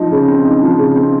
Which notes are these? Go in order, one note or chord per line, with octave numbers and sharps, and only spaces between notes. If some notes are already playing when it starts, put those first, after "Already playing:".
Already playing: F3 D#4
C#3
C4
D#4
F3
C#3
C4